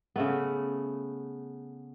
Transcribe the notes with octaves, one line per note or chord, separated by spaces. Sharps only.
C#3 A3 B3